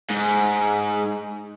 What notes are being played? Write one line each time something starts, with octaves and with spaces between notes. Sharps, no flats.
G#2